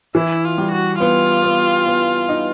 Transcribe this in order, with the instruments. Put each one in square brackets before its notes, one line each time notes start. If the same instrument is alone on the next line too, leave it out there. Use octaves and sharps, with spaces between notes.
[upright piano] E3 [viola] E4
[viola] F4
[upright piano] G3
[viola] F#4
[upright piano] B3 [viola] F4
[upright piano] B3
B3
D#4